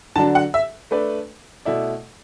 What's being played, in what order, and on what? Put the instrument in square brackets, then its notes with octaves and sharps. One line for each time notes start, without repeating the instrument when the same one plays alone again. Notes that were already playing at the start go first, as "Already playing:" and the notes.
[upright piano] D3 F#3 D4 [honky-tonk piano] A5
[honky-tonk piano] F#5
E5
[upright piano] A3 D4 B4 D5
B2 A3 E4 D5